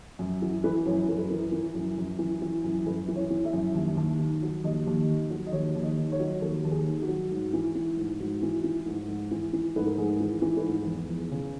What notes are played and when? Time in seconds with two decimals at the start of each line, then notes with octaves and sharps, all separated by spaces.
0.19 F#2
0.42 E3 F#4
0.64 E3 B4
0.86 F#2 C#5
1.08 F#2 A#4
1.18 B4
1.30 E3 A#4
1.52 E3
1.75 F#2
1.98 F#2
2.19 E3
2.42 E3
2.64 F#2
2.86 F#2 B4
3.08 E3
3.16 C#5
3.30 E3
3.45 E5
3.53 F#2
3.75 D#2
3.97 D#2
4.19 D#3
4.42 F#3
4.64 D#2 D#5
4.87 D#2
5.09 D#3
5.30 F#3
5.46 D#5
5.52 D#2 C#5
5.76 D#2
5.83 D#5
5.98 D#3
6.12 C#5
6.20 F#3
6.41 D#2 A#4
6.64 D#2
6.71 G#4
6.87 D#3
7.02 F#4
7.08 F#3
7.31 G#2
7.53 E3
7.75 E3
7.97 G#2
8.20 G#2 F#4
8.43 E3
8.64 E3
8.86 G#2
9.08 G#2
9.31 E3
9.53 E3
9.76 G#2 B4
9.87 A#4
9.98 G#2 G#4
10.20 E3
10.42 E3
10.57 B4
10.64 G#2
10.86 E2
11.09 E2
11.31 C#3